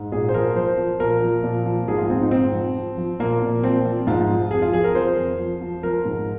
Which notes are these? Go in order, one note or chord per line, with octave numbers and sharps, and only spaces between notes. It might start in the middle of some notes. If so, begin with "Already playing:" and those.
Already playing: G#2
A#2 G#4
C5
F3 A#4
F3 C5
F3
A#2 A#4
F3
A#2
F3
G#2 G#4
F4
G#2 C4
D#4
G#2 C4
F3
F3
F3
A#2 A#3
A#2
F3 C4
F3
G#2 F4
F3
F2 G#4
F4
F3 G#4
A#4
F2 C5
F2
F3
F3
F3 A#4
G#2